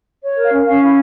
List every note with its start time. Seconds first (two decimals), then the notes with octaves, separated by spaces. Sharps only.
0.20 C#5
0.35 A#4
0.43 F5
0.50 C#4
0.65 C#4 F5
0.80 E4